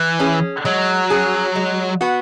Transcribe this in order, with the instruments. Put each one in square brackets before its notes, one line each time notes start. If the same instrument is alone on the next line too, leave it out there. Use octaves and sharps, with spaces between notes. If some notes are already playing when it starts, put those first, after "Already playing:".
Already playing: [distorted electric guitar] E3
[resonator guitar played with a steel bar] C#4 G#4
[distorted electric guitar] F#3 [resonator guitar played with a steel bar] G#3
[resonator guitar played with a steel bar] C#4 G#4
G#3
B3 F#4